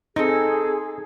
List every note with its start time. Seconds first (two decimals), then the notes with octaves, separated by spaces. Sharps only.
0.16 C4 D#4 G#4 A4